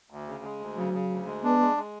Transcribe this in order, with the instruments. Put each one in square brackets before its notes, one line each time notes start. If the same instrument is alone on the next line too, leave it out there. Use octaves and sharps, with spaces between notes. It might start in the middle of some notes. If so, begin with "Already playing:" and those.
[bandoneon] D2
C#3
G#3
D2
[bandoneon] C#3 [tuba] F#3
[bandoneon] C#3
D2
G#3
[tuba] B3 [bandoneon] D4
[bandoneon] G#3
G#3